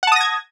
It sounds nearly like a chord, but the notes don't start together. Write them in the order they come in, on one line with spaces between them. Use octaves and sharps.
F#5 A5 D#6 A#6 G#6